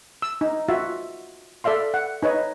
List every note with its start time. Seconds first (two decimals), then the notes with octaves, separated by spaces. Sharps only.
0.22 E6
0.41 D#4
0.68 F4 F#4 E5
1.64 A4 D5 E5 F5 C6
1.94 F#5
2.23 D#4 B4 C#5 D#5